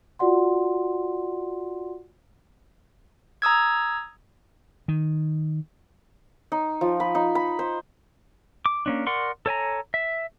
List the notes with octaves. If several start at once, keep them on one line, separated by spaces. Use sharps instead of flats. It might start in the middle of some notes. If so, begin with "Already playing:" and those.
F4 F#4 D5 F#5 C6
A#5 D#6 E6 G#6
D#3
D#4
F3
B5
D#4
B5
C5
D6
A#3 C#4 D4
A#4 D5 F#5 C6 C#6
A4 C#5 G#5 A#5
E5